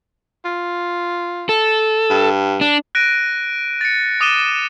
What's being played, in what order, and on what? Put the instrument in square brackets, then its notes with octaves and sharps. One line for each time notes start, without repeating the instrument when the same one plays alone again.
[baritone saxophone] F4
[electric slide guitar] A4
[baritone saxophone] G2
[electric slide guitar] D4
[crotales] F#6 A#6 D7 D#7
A6 C#7
D6 D#6 A6 D#7 E7 G7